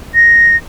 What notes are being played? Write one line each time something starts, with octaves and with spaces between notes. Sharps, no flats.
A#6